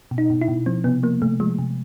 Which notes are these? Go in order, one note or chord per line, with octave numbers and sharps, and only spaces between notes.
B2
D#4
B2
E4
B2
F3 C4
C3 B3
F3 A#3
C3 A3
F3 G#3
C3